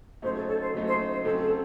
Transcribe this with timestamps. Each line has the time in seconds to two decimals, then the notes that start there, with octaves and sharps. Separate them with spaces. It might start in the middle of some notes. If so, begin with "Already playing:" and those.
0.22 C#3 F#3 A3 D#4 C5
0.36 A4
0.48 A4 C#5
0.61 C5
0.73 C#3 F#3 A3 D#4 A4
0.87 C5
1.12 C5
1.24 C#3 F#3 C4 A4
1.42 A4